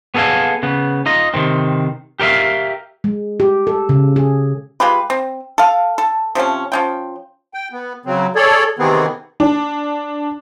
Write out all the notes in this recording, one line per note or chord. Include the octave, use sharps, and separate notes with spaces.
B3 G#4 A4 B4 F5 G#5
C#3 B3
D#4 F4 D#5
C3 D#3 C4
G4 A#4 D5 E5 F5
G#3
G4
A4
C#3
G#4
G#3 F4 G4 B4
C4
A4 F5
A4
C3 F3 A3 C#4
F3 C#4 G5
G5
B3
C#3 F#3 C4
G#4 A4 C#5 D5
C3 D#3 E3 B3 C4 G#4
D4